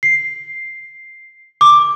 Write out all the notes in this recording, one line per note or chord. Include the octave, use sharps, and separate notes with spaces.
C7
D6